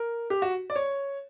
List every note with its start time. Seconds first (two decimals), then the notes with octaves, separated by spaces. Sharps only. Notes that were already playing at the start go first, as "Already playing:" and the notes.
Already playing: A#4
0.30 G4
0.42 F#4
0.70 D5
0.76 C#5